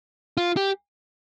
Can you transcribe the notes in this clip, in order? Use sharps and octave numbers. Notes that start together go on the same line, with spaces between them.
F4
G4